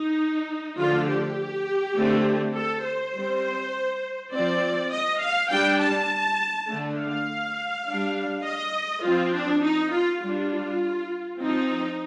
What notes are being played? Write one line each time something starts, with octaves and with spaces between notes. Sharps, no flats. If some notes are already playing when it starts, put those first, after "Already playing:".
Already playing: D#4
D3 F3 A3 D4 F4
G4
D3 A3 C4
A4
C5
G3 C4
F3 C4 D5
D#5
F5
G3 D4 G5
A5
D3 A3 D4
F5
G3 D4
D#5
F3 C4 F4
D4
D#4
F4
G3 D4 F4
F3 C4 D#4